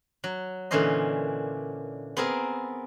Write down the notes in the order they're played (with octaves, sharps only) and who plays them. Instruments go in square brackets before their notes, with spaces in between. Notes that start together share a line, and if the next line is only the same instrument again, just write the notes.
[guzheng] F#3
A#2 D3 E3 C#4 C5 D#5
B3 C4 G#4 A#4